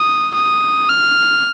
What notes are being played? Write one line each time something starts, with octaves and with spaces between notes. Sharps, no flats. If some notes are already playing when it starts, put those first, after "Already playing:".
Already playing: D#6
D#6
F6